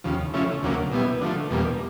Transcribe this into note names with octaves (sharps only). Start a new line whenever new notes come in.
D#2 C#3 F3
C#3 F3 A3 C#4 E4
D2 C#3 F#3 A#3
B2 G3 B3 E4
D3 F3 A3
E2 B2 G3 A#3